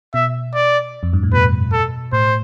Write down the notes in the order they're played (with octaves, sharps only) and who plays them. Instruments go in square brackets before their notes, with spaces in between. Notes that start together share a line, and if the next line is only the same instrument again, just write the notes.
[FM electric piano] B2 [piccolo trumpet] E5
[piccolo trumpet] D5
[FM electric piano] F2
G2
A2
[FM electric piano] B2 [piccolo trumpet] B4
[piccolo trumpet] A4
[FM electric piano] A2 [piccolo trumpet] C5